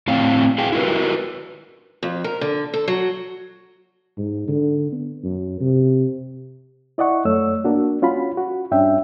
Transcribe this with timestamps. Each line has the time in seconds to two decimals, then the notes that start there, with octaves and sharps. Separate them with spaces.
0.08 A2 C4 F5
0.58 G#4 F5 G5
0.72 E4 F#4 A#4 B4
2.03 F2
2.24 A#4
2.41 D3
2.74 A4
2.88 F#3
4.18 G#2
4.48 D3
4.92 B3
5.23 F#2
5.61 C3
6.98 E4 D5 D#5 F#5 C#6
7.25 F#2 A3 C#5 E6
7.65 A#3 D4 F#4
8.02 C#4 F4 F#4 B5
8.37 F#4
8.72 G2 C#4 D4 E5 G5